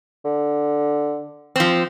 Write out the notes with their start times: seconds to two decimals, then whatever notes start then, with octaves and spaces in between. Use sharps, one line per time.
0.25 D3
1.56 F3 C4